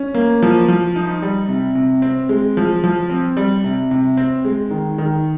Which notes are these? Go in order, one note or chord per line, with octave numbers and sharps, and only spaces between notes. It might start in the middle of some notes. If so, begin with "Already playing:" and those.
Already playing: C#4
A#3
F3
F3
D#4
G3
C3
C3
C4
G#3
F3
F3
C4
G3
C3
C3
C4
G#3
D#3
D#3